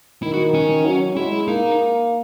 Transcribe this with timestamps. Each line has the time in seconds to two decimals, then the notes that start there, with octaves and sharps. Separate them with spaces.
0.23 D#3 E4
0.34 F#4
0.54 C#4
0.85 F#3
1.17 G#3 E4
1.48 A#3 D#4